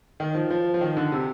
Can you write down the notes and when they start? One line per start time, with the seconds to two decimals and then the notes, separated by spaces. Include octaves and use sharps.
0.20 D#3
0.35 F3
0.50 F3
0.74 F3
0.81 D#3
0.97 D3
1.12 C3